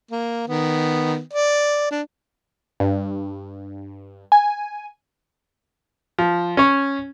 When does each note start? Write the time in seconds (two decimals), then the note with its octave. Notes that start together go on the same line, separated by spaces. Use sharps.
0.11 A#3
0.48 D#3 B3
1.33 D5
1.91 D4
2.80 G2
4.32 G#5
6.18 F3
6.57 C#4 C#5